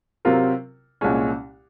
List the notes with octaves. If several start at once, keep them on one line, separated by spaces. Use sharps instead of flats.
C3 F#3 C4 F4 A#4
C2 A#2 G#3 C#4